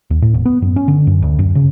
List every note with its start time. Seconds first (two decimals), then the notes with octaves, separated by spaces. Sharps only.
0.10 D#2
0.22 A2
0.34 E1
0.46 B3
0.62 F#2
0.76 C#4
0.88 D3
1.07 F#2
1.22 D2
1.39 F#2
1.55 C#3